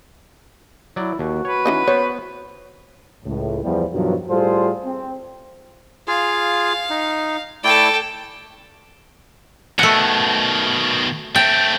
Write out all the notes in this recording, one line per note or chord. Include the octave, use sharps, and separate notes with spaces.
F#3 E4 D5
D#2 F#4
B4 C#5
E3 C#4 D#4
B3 C5 C#5
C#2 A2
E2 F3 G3
G2 B2 D#3 F3 F#3
A2 G3 F4 G#4 A4 C5
C4
F4 G#4 F5
D#4
A3 E4 A4 D5 G5
B2 D#3 A3 F#5
A3 C4 G5